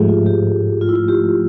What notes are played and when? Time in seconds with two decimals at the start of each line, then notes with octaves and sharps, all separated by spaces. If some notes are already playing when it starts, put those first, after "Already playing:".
Already playing: G#2 F3 A3 G4 G#4
0.08 F4
0.26 G4
0.81 F4
0.89 E4
0.96 F4
1.08 G4